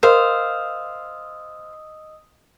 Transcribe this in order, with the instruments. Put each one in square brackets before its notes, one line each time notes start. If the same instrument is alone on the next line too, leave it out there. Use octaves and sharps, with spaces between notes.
[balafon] A#4 [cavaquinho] C5 F5 [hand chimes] D#5 D#6 E6